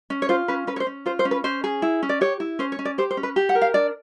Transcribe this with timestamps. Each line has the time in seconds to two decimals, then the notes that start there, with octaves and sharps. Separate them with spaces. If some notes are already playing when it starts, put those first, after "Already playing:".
0.10 C#4
0.22 C#5
0.29 F4 C5
0.48 C#4 B4
0.67 C#4 B4
0.76 C#5
0.80 C5
0.87 C#4
1.06 F4 C5
1.19 C5
1.25 C#4
1.31 B4
1.44 C#4 C5
1.64 G#4
1.82 E4
2.03 C#4
2.09 D5
2.21 G4 C#5
2.40 E4
2.59 C#4 C5
2.72 C#5
2.79 C#4
2.85 D5
2.98 G4 C5
3.11 C5
3.17 C#4
3.23 B4
3.36 G4
3.49 F#5
3.55 A#4
3.62 F5
3.74 D4 D5